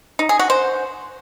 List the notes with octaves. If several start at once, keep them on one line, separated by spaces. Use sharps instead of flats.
D#4
G#4
F#4
C5